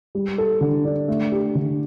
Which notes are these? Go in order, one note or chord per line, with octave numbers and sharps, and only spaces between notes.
G3
A4
D3
D4
A3
G4
D3